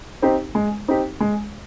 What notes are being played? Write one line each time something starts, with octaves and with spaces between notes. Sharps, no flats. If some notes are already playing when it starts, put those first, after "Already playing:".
C4 D#4 G4
G#3
C4 D#4 G4
G#3